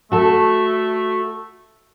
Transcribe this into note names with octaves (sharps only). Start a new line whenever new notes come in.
A3 F#4 A4